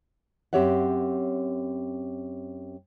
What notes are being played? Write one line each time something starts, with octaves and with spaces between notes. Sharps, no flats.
F#2 C4 G4 C#5 E5 F#5